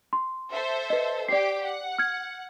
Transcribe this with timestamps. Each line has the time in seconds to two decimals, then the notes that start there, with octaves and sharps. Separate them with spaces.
0.13 C6
0.53 A4 C5 E5
0.90 B4 D#5
1.29 G4 D5 D6 C7
1.65 F#5
1.99 F6 G#6 C#7